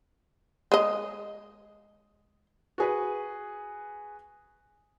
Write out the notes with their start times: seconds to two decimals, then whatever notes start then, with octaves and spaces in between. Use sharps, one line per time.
0.72 G#3 D#5
2.78 F#4 G#4 B4